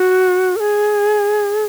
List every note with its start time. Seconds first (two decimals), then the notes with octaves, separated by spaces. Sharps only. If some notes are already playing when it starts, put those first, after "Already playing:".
Already playing: F#4
0.56 A#4
0.60 G#4